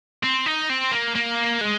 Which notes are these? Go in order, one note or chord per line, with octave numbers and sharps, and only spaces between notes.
C4
D#4
C4
A#3
A#3
G#3